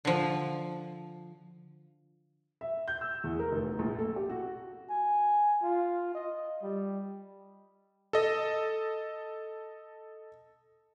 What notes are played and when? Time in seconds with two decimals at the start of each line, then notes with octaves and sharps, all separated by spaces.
0.05 D3 F3
2.61 E5
2.88 G6
3.01 E6
3.24 E2
3.39 A#4
3.52 F1
3.79 A#1
3.99 A4
4.16 G4
4.30 F#4
4.90 G#5
5.63 F4
6.15 D#5
6.62 G3
8.13 A4 D#5